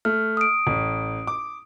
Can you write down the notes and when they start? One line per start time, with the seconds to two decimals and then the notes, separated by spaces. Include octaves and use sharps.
0.05 A3 F6
0.37 D#6 D7
0.67 A1
1.27 D6